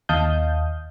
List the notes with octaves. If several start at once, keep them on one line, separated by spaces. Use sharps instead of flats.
D#2 D#5 F5 A5 D#6 G6